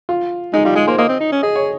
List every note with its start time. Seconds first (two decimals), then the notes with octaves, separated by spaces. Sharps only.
0.09 F4
0.53 G#3 D#4
0.65 G3 F4
0.75 G#3 G#4
0.87 A#3 C5
0.98 A#3 D#5
1.09 C4
1.20 D#4
1.32 C#4
1.43 G#4 D#5
1.56 C#5